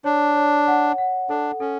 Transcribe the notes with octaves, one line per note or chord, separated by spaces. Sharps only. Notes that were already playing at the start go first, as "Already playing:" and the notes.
D4 C#5
C#5
F#5
F#5
D4 A4
C#4 A4